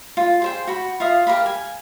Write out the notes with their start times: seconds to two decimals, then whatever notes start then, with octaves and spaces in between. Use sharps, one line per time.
0.17 F4
0.42 G#4 C5 G5
0.67 F#4 B5
1.00 F4 E5 F5 D#6
1.27 G4 A#4 F5 B5
1.46 G#5